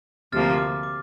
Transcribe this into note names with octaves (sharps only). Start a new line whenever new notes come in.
D2 C3 F3 A#3 F6 A6
D6
D6